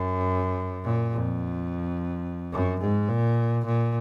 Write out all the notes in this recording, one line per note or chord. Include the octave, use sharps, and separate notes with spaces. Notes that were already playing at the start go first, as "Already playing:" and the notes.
Already playing: F#2
A#2
F2
F#2
G#2
A#2
A#2